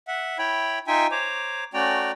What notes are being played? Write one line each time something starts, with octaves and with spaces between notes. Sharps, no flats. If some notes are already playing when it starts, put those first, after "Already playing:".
E5 F#5
E4 C#5 G5 B5
D#4 F4 E5 G5 G#5
C5 C#5 A#5 D6
A3 C#4 F#4 D5 G5 A#5